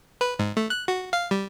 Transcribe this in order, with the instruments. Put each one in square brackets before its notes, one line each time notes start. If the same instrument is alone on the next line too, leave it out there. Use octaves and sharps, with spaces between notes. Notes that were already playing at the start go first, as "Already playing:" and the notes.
[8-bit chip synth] B4
G#2
A3
F#6
F#4
F5
G3